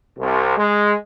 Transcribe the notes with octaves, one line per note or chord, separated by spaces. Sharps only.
C2
G#3